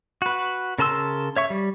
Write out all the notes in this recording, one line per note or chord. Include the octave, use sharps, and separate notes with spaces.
F#4 B4
C#3 A#4 A5 C6 E6
C#5 E5 C#6
G3